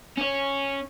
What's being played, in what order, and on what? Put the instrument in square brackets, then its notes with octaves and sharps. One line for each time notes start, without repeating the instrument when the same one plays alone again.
[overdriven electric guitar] C#4 C#5